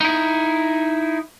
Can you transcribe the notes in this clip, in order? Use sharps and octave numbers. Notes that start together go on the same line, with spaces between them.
D#4 E4